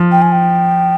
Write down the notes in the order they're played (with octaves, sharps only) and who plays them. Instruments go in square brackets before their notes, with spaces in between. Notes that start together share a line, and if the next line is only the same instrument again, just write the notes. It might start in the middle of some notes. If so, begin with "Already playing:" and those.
Already playing: [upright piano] F3
[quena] G5
G#5
G5